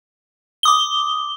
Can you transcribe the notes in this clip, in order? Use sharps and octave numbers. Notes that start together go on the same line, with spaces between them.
D6 D#6 G7